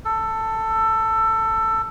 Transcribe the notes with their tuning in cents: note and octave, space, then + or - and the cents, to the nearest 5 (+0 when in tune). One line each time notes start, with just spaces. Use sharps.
A4 +15